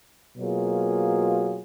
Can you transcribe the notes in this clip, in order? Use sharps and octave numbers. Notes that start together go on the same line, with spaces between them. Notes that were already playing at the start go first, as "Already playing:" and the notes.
B2 F#3 A#3 F4 G#4